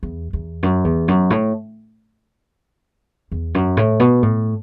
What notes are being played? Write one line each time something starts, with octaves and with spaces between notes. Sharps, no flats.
E2
E2
F#2
E2
F#2
A2
E2
F#2
A2
B2
A2